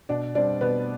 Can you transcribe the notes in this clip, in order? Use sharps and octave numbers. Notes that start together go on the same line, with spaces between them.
B2 D4 D5
G3 C4 D4 D5
B2 B3 B4